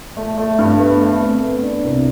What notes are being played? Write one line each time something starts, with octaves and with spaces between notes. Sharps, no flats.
A3
A3
G2
B3
A3
C4
B3
D4
C2